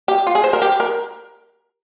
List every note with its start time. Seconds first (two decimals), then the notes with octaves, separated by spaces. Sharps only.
0.08 G4
0.27 F4
0.35 G#4
0.44 C5
0.53 A#4
0.62 G4
0.80 A#4